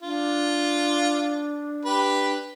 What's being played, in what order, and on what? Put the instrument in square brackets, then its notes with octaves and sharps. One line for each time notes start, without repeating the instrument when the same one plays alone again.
[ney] D4 [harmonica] F4
[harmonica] G4 B4